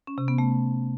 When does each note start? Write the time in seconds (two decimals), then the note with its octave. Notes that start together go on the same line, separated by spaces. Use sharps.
0.07 C#4
0.18 C3
0.28 B3
0.38 A3